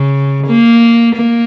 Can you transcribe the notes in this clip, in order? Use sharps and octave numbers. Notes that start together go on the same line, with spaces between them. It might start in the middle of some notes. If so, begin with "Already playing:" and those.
Already playing: C#3
A#3
A#3